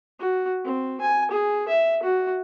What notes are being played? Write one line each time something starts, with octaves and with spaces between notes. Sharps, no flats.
F#4
C4
G#5
G#4
E5
F#4